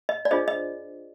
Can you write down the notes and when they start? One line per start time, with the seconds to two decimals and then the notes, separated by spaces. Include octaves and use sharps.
0.09 D#5
0.25 D5
0.31 D4 F4 G#4 C5 D#5
0.48 D#5